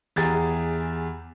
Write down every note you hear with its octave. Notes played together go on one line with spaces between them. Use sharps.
E2 G4 G#4 A#5 G#6 A6